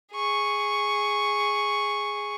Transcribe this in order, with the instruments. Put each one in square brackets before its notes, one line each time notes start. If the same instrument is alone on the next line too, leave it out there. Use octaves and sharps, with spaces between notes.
[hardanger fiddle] G#4 C#6